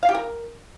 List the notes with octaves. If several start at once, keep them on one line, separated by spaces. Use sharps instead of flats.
F5
G4
A#4